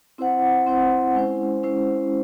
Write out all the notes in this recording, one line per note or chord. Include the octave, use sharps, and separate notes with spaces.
C4 E4 C5 F#5
C4 E4 C5 F#5
G#3 C#4 E4 C5
G#3 C#4 E4 C5